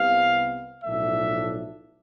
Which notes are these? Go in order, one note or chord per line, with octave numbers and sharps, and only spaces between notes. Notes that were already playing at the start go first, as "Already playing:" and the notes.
Already playing: C2 C3 G3 B3 F5
B1 A2 F3 A3 D4 E5